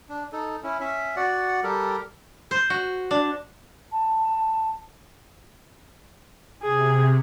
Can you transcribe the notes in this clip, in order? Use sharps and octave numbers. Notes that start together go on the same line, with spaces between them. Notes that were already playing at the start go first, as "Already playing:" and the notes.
D4
D#4 A4
C#4 E4
C#4 E5
F#4 D5 F#5
G3 G4 A4 A#4
C5
F#4
D4
A5
C3 G#4